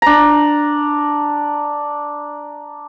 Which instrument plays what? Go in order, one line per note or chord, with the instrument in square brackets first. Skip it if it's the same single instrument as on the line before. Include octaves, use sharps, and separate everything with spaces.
[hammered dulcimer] D4 A#5